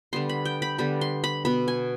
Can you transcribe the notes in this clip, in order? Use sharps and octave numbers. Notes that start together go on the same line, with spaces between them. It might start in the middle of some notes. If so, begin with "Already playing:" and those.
D3 G3 B3 C6
B5
G5
B5
D3 G3 B3 B5
C6
B5
B2 B3 B5
G#5